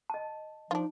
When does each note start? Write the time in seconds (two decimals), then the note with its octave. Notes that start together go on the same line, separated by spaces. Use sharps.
0.10 D#5 A5
0.71 F3 D4 D#4 F4